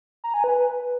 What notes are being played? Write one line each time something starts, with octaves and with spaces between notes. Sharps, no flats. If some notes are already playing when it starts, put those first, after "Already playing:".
A#5
G#5
B4